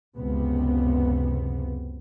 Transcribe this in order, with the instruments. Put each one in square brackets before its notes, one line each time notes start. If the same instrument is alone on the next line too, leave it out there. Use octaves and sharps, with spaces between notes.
[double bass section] C#2 F#2 C3 B3